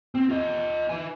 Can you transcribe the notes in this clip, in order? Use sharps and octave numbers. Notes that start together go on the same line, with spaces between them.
C4
F4 D#5
E4 G#5